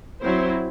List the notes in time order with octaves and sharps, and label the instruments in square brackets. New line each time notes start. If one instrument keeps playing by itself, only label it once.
[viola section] F#3 C4 E4 C5